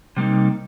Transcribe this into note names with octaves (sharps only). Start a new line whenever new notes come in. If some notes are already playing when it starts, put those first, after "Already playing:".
C3 G3 A#3 D#4